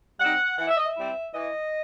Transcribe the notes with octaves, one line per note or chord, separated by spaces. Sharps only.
G3 C4 D#4 F#5
E3 F#5
E5
D#5
E5
G3 C4 E4
E3 D#5